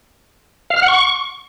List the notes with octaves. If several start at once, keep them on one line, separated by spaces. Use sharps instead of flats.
F5
F6
F#5
C#6